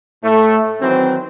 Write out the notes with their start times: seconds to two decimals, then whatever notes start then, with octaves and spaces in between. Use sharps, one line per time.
0.23 A2 A3
0.81 D#3 E3 F#3 C4